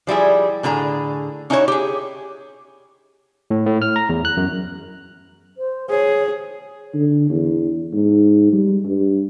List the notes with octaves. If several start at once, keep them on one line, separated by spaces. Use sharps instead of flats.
F3 G3 E4 G#4
A2 D3 G#4 A#5
C#4 D#4 E4 F#4 A#4 C#5
G4 G#4
A2
A2
F6
A#5
E2
F#6
F#2
C5
G#4 C#5
D3
E2
G#2
G3
G2